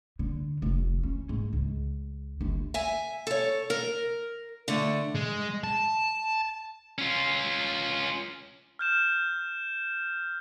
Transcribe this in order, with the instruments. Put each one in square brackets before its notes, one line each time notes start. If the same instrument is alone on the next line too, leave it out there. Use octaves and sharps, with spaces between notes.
[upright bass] D3
F1
C#4
G#2
C#2
G1
[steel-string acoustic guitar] E5 G#5
A4 C#5
A#4
D3 A3
[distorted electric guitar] G#3
A5
C#4 F4
[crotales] F6 G6 E7